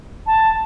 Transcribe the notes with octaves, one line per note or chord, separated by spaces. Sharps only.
A5